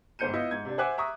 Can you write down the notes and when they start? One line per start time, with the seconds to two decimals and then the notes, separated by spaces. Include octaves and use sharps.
0.19 G1 G#2 C5 G6 C#7 D#7
0.33 B3 E4 F4 D#5 E5
0.51 G#2 G#6
0.65 C3 D4
0.78 C5 E5 F#5 G#5 D6 F#6
0.97 E5 A#5 C#6 D#6